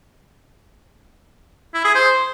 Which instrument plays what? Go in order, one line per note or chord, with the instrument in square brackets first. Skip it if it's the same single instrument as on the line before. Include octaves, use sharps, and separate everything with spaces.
[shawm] E4
G#4
C5